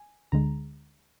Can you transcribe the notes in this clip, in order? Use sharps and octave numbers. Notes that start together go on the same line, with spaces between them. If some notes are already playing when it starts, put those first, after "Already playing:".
Already playing: G#5
D2 D3 G#3 A#5